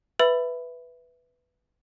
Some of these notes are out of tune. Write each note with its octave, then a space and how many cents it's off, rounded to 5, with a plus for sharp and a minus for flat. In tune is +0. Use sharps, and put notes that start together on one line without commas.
B4 +0 E5 +0 B5 +10